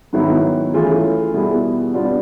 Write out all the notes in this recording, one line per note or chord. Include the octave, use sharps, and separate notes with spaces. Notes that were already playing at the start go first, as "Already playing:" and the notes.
G#2 D#3 F#3 B3 E4
E3 A3 C#4 F4 G#4
B2 G3 B3 E4 G#4
G3 B3 D4 F4